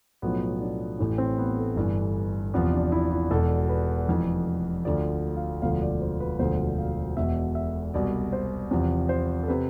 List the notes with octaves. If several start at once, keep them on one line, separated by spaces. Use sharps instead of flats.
B1 A2 F3 B3
D4
A1 A2 E3
C4
B3
A3
G1 G2 E3
E2 C3 F3 B3
D4
E4
E4
E1 E2 B2 A4
B4
F1 F2 E3
D2 D3 F3 D5
F5
E1 D2 D3 F3 F5
D5
C5
B4
E1 D2 D3 F3 C5
F5
E1 E2 B2 E5
E5
C2 B2 D5
C5
E2 C3 F3
C5
A4
C3 B4